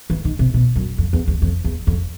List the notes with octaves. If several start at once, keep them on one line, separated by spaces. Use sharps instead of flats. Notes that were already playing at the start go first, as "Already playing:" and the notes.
E3
D#3
C3
B2
F#2
F2
E2
E2
F2
E2
F2